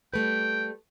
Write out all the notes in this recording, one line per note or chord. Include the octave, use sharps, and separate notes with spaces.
G3 A3 B4 G5